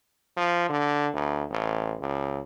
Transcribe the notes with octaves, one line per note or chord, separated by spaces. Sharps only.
F3
D3
D2
A1
C#2